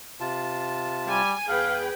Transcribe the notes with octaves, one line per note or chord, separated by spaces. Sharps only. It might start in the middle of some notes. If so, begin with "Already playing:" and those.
C3 F4 A5
G3 G#5
E2 G#4 B4 F5 G5